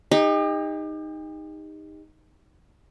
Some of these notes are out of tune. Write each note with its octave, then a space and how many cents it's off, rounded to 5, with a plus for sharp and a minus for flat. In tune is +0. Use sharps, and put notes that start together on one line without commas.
D#4 +0 G4 +40